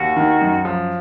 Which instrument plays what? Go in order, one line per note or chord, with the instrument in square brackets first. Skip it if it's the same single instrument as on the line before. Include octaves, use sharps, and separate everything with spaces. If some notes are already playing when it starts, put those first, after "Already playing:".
Already playing: [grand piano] D#2 [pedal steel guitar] F#4
[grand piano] D#3
F#2
F3